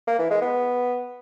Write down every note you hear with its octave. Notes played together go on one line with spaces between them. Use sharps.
A#3
E3
G#3
B3